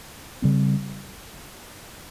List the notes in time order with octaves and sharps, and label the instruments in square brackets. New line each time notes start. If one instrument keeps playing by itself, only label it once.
[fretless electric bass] C#3 G3 C4